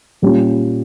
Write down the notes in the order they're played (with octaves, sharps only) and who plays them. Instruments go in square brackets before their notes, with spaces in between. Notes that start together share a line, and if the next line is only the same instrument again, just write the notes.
[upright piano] A#2 G3 C#4 F4